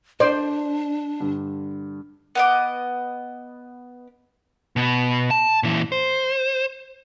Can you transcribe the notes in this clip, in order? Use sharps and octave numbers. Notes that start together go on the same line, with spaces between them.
D4 C5 D5
G2 D3
B3 D#5 D6
B2 B3
A5
A#2 E3
C5